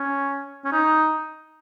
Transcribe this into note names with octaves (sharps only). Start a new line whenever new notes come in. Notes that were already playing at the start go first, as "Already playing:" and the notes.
Already playing: C#4
C#4
D#4